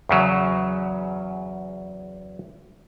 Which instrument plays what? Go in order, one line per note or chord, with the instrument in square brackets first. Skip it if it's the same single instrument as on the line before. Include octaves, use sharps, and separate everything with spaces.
[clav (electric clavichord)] E2 C#3 F#3